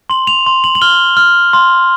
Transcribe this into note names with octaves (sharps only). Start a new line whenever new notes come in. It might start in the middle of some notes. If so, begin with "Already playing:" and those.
C6 F#7
F7
C6
F#7
F#7
F6 G7
F6
C6